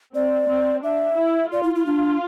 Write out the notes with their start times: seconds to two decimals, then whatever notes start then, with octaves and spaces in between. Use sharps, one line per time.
0.15 C4 D5
0.50 C4
0.83 D4 E5
1.18 E4
1.52 F4 D5
1.63 E4
1.75 E4
1.86 D4